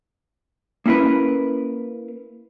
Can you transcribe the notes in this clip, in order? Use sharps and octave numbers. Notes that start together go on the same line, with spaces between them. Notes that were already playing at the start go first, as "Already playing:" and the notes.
A#3 C#4 E4 A#4 B4